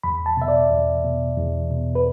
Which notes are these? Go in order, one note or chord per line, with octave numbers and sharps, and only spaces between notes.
E2 B5
A5
B2 E5
D5
E2
B2
E2
B2
B4